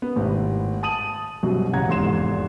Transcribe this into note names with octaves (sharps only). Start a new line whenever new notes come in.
B3
G#1 A2 C3
A5 D#6 D#7 F#7
C2 F#2 B2 F#3
A1 C#3 F#5 A#5 G#6
F1 E2 G#2 C6 E7